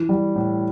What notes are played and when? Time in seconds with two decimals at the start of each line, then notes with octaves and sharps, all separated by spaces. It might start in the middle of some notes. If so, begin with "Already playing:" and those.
Already playing: E3
0.09 G3
0.36 A2